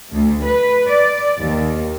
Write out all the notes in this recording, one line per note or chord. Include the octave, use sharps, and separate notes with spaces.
D2
B4
D5
D#2